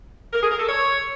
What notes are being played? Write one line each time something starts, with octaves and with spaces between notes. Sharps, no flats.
A#4
G#4
A#4
A4
C#5